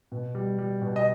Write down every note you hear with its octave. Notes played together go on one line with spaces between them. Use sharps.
B2
G3
G3
B2
D#5